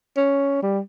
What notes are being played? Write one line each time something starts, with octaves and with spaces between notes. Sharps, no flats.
C#4
G3